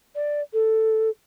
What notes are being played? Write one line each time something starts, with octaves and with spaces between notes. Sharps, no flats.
D5
A4